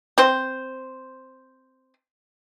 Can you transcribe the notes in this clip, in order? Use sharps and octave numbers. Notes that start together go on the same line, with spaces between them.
C4 C5